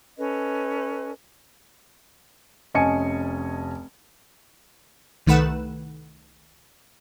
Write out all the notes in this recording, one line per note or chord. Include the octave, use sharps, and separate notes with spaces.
C#4 A4 B4 D#5
F1 C#4 D#5 G#5 A5 C#7
C2 D#3 A3 B4 F#5 E7